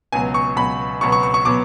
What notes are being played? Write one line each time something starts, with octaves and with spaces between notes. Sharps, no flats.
C#2 B2 F#3 B3 G#5
C#6
C#2 B2 F#3 B3 B5
C#2 B2 F#3 B3 C#6
C#6
C#6
C#6
B2 F#3 B3 D6